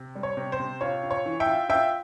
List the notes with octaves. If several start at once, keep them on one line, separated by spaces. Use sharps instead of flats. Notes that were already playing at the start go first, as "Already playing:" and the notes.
Already playing: C3
G3
C#5
C3
C5
C3
F4 C#5
F4
C#5
E3
E5 G5
F4
F4 E5 G5